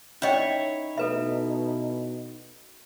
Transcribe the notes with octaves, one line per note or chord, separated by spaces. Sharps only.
C#4 D#4 E4 C#5 D#5 G5
B2 A4 B4 E5